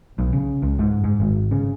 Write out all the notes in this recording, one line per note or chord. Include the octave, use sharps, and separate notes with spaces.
B1
C#3
C#2
G#2
G#2
G#1
C#3